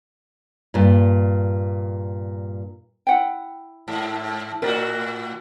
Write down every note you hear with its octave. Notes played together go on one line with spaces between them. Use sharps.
G2 A#2
E4 F#5 G5
G#2
A2 F#4 A#4 D5